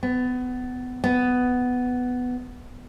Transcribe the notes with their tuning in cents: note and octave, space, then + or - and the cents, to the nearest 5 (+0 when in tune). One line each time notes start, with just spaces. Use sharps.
B3 +25
B3 +10